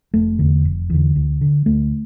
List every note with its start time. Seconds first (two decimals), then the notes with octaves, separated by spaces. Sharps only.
0.14 F1 A3
0.39 E2 D3
0.65 F1
0.90 E2 D3
1.16 D2
1.41 D3
1.66 D2 A3